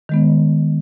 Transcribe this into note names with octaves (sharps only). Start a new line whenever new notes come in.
D#3 G#3 B3